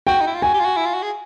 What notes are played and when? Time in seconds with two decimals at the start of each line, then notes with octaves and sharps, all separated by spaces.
0.07 F#4 G5
0.21 D#4
0.27 E4
0.35 F4
0.42 F#4 G#5
0.54 G4
0.60 F4
0.65 F#4
0.76 E4
0.86 F4
0.94 F#4
1.03 G#4